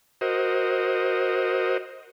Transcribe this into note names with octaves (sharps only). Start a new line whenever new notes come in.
F#4 A#4 C5 D#5